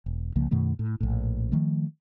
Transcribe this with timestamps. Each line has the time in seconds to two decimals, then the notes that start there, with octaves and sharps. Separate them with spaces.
0.06 E1
0.36 C2 C#3 F3 A#3
0.51 F#2 B2 D#3 A3
0.79 A2
1.00 A#1 A2
1.52 D#3 F3 A3